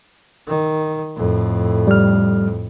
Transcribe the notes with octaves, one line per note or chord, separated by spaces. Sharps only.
D#3
F2 A2
G3 F6